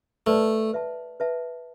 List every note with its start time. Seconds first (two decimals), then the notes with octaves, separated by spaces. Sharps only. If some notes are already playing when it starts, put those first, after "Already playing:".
0.27 A3 B4 D5 A5
0.73 B4 E5 A5
1.20 B4 E5 A5